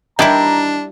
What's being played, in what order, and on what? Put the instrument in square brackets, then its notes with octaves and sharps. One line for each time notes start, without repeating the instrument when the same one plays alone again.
[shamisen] D#3 E3 G4 [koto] G3 E4 [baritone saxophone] D4 [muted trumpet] A#5